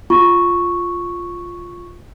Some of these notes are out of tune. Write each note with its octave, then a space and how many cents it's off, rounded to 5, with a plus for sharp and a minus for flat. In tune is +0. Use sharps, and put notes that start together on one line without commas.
F4 +0 C#6 +0